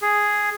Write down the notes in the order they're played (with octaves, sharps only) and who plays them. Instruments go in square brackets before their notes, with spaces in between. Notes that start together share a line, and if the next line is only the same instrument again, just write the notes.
[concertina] G#4